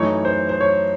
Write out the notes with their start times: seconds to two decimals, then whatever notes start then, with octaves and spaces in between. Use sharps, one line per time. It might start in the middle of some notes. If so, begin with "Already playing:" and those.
Already playing: F#2 E3 A3 D#4 C#5
0.25 C5
0.49 C5
0.61 C#5